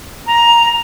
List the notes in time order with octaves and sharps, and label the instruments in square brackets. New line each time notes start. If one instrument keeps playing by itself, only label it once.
[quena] A#5